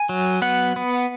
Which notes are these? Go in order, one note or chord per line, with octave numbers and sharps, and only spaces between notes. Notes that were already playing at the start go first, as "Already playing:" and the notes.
Already playing: G#5
F#3
B3 F#5
B3